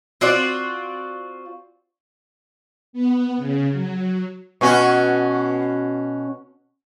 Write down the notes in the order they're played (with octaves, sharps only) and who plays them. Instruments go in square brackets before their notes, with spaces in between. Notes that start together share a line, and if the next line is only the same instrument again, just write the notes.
[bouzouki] C4 F4 F#4 D5
[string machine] B3
C#3
F#3
[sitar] B2 C#4 F#4